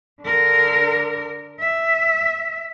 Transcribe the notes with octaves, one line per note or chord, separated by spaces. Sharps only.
D3 A#4
E5